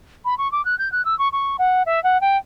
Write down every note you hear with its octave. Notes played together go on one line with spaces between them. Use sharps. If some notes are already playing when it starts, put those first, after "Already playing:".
B5
C#6
D6
F#6
G6
F#6
E6
C#6
C#6
F#5
E5
F#5
G5